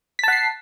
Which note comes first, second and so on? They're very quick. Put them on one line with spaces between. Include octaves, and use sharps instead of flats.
B6 A5 F#5 C7